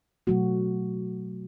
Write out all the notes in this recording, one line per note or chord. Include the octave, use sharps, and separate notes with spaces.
B2 F#3 A3 F#4